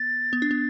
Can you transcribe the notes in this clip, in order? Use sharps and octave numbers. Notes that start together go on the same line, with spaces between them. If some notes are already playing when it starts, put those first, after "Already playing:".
Already playing: B3 A6
B3
D4
B3